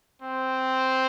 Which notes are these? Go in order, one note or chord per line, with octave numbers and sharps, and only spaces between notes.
C4